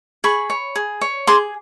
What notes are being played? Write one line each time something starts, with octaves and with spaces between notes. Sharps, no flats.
G#4 B5 C#6
C#5
G#4
C#5
G#4 C6 D6